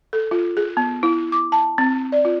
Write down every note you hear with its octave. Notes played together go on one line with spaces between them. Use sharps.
A4
F4
G#4
B3
E4
D6
A5
C4
D5
F4